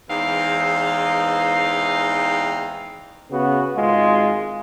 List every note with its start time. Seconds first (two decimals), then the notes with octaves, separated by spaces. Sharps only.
0.10 E2 E3 G#3 C4 D#4 F5
3.30 C#3 B3 F#4
3.75 G#1 G#3 F4